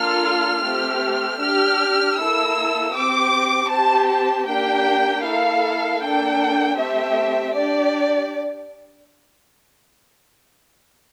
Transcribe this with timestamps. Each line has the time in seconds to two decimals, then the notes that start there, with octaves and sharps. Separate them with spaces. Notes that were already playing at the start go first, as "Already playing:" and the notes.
Already playing: A#3 D4 F4 A4 F6
0.62 A3 C4 G4
1.38 D4 G4 F6
2.16 A#3 E4 A4 E6
2.92 C4 G4 D6
3.69 C4 G4 A5
4.07 A5
4.46 A#3 D4 G4 G5
5.23 A#3 E4 A4 F5
6.00 A#3 D4 A4 G5
6.76 A3 C4 G4 E5
7.53 D4 G4 D5